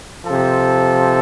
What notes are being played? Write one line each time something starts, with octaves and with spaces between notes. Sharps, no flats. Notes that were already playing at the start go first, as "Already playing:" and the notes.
C3 F3 A4